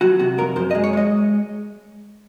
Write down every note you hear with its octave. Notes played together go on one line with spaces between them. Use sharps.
F#3 F#4
C3 F#4
F2 A#4
F#2 C5
D#5
G#3
C#5
G#3 D#5